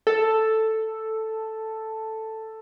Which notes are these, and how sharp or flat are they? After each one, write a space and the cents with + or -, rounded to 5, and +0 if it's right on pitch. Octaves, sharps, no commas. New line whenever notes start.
A4 +5